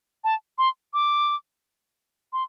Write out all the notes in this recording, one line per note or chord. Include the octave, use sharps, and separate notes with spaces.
A5
C6
D6
C6